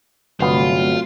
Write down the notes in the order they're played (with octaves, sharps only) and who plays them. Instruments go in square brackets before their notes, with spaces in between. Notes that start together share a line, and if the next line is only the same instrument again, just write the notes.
[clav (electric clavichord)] G1 B3 [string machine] C3 A3 [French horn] F#3 [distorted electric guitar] F4